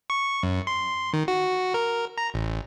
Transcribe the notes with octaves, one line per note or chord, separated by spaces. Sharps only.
C#6
F#2
C6
D#3
F#4
A#4
A#5
A1